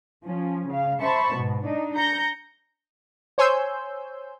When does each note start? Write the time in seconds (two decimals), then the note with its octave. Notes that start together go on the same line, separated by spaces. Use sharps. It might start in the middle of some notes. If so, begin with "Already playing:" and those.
0.24 F3 C#4
0.68 C#3 F5
1.01 C5 E5 A5 B5 C#6
1.34 G#2 B2
1.65 D4 D#4
1.95 A#5 G6 A#6 C#7
3.38 C5 C#5 G#5 C6 E6 G6